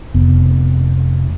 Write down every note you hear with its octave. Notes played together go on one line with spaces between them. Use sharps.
F1 B3